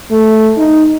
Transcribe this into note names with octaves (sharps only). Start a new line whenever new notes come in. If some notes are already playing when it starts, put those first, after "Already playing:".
A3
D#4